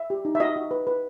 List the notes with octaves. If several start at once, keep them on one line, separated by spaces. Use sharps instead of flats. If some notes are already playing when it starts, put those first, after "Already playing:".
Already playing: E5
G4
D#4
E5
F#4 D#5
F#4
B4
B4